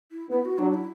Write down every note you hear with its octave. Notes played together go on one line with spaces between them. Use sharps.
E4
B3 E4
F#4
F#3 D4
E4